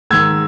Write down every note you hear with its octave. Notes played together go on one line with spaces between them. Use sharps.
G#2 D#3 E6 G#6